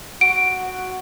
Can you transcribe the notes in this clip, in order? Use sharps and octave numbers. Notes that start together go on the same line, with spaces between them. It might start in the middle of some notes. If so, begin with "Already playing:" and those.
F#4 D7